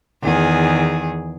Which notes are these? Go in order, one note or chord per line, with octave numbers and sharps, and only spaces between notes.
E2 D#3 G#4